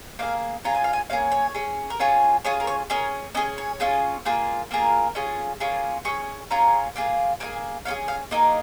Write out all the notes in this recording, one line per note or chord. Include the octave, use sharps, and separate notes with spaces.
A#3 D#4 G#4 F5
C#4 F4 G#4 A#5
G#5
F5
G#5
A#3 C#4 G#4 F5
C#5
C#4 G#4
A#4
C#4 F4 G#4 C#5
C#4 F4 G#4 C#5
A#4
C#5
C#4 G#4 A#4
C#4 G#4 D#5
C#5
C#4 F4 G#4
A#3 F4 G#4
A#3 F4 G#4 A#4
C#4 F4 G#4
A#3 C#4 F4 G#4
C#4 G#4 C#6
C#4 F4 G#4 A#5
A#3 F4 G#4
A#3 D#4 G#4 G#5
C#4 F4 G#4 F5
F5
A#3 D#4 G#4 D#5